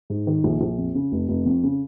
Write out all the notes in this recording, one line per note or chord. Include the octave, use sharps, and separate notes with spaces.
G#2
D#3
A#1
A#1
F2
C#3
F1
F1
F2
C#3